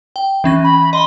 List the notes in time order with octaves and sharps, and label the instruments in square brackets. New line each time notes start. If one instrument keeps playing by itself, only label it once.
[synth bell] G5
E3 C#4 A#6
[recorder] B5
[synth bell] D#5 B5 [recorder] C6